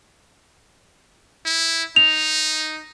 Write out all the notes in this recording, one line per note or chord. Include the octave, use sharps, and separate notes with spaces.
E4
D#4 F7